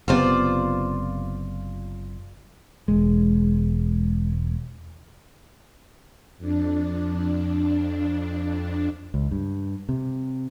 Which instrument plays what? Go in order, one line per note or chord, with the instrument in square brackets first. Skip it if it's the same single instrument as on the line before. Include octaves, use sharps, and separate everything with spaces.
[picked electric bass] F#1 C3 B3 [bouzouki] F4 C5 D5
[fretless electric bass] E1 G#3
[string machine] F2 D4
[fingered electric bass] C#2
G2
C3